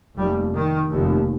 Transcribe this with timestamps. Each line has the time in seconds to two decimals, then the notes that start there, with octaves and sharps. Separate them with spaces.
0.17 F1 D#2 G3
0.54 D#3
0.92 F1 D#2